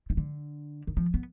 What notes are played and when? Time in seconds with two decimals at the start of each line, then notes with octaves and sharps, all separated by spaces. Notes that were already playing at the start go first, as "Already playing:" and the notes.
0.10 D#3
0.17 D3
0.87 D#3
0.97 F3
1.14 B3